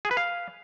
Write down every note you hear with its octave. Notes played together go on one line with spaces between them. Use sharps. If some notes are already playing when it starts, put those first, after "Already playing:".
G#4
B4
F5